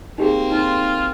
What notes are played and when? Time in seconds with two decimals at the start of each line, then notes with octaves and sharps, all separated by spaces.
0.18 A#3 C4 D#4 G4 G#4
0.52 D#4 F4